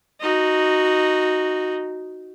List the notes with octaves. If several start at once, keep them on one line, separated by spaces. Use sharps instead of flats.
D#4 F#4